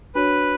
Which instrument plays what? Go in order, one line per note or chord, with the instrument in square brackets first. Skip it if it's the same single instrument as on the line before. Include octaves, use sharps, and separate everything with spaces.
[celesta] D4 F#4 C#5 [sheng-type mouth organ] B4